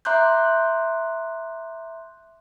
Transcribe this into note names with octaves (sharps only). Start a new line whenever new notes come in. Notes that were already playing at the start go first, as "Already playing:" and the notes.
E5 A#5 C6 D6 F#6 G6